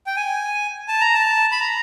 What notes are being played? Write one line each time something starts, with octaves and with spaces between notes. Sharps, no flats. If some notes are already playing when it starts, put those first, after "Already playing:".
G5
G#5
A5
A#5
A5
B5
A#5